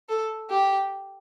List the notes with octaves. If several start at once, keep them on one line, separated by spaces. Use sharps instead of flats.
A4
G4